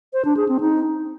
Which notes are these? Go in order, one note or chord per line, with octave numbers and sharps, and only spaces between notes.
C5
D4
G#4
C4
D#4